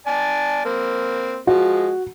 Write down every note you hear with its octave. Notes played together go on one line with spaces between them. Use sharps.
D5 G#5 A5
A#3 C4
F3 G#3 F#4